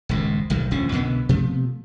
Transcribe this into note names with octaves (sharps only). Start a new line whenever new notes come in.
D#1 C#2 G#2
D1 B1 D#3 G3
D#1 D2 F3 C#4
C2 B2 D3 B3
B2 F3 A3 B3